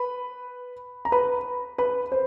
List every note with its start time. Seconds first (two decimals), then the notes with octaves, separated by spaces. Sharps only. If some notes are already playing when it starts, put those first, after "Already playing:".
Already playing: B4 B5
1.05 A#5
1.12 B4 B5
1.78 B4 B5
2.12 C5